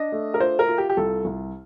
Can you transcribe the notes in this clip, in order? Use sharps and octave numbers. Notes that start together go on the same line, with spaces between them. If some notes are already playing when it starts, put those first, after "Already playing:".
Already playing: D4 D#5
A3
A#4
F4 C5
A#4
F4
G4
G4
C2 A4
C2